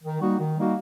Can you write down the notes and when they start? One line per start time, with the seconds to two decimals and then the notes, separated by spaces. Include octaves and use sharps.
0.03 D#3
0.20 G3 A#3 D#4 F#4
0.38 D#3
0.56 G3 A#3 D#4 F#4